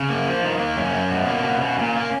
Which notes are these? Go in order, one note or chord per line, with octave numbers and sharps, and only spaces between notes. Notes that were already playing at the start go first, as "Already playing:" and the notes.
Already playing: C#3
A#3
F3
D#3
A#3
F#2 C#4
F#2
B2
A#3
B2
B2
A#2
A#3